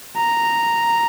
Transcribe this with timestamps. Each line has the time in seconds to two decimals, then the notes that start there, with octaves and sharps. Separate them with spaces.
0.18 A#5